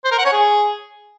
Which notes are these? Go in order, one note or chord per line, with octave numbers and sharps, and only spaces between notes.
C5
A#4
F#5
C#5
G#4